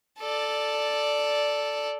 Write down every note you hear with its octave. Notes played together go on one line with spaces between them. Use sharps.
A4 D5